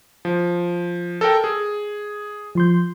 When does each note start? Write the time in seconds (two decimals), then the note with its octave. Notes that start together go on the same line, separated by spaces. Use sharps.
0.25 F3
1.21 A4 A#4 G5
1.44 G#4
2.55 F3 C6 G6